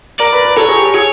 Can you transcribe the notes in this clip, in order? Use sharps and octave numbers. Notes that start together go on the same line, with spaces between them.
A#4 D5
B4
B4
A4 C#5
G#4
G4
G#4 C#5